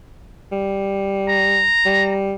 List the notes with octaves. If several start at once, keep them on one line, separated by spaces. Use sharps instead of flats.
G3
A#5
G3